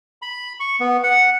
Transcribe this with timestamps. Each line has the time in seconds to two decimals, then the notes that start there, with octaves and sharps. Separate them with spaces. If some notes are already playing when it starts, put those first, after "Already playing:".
0.22 B5
0.60 C#6
0.80 B3
1.03 F#5